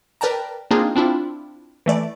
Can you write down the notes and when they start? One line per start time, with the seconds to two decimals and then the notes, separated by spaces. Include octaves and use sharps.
0.21 A#4 B4 D5 G5 A5 A#5
0.71 A#3 C4 D4 D#4 F4 G#4
0.95 C4 D4 E4 F4
1.86 E3 A3 D5